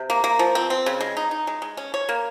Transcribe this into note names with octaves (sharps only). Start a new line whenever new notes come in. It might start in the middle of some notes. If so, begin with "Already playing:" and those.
Already playing: C3
A#3
A#3
F3
C4
C4
C#3
G#3
D#4
D#4
G#3
G#3
C#4
C#5
A#3